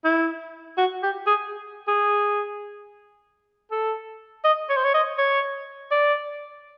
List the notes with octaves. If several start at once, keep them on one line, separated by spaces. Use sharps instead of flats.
E4
F#4
G4
G#4
G#4
A4
D#5
C#5
C5
C#5
D#5
C#5
D5